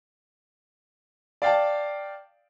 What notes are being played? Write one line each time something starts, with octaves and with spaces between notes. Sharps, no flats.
D5 F5 G5 A5